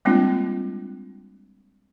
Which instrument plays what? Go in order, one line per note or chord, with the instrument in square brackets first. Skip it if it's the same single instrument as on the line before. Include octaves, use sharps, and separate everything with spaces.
[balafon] G3 G#3 A#3 C4 D4 F4